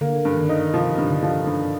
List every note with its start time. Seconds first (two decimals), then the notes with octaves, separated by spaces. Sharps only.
0.01 D3 A#3
0.25 G2
0.37 D#3
0.49 D#4
0.74 C3 F3
0.98 G2
1.10 D3
1.23 F3
1.47 G2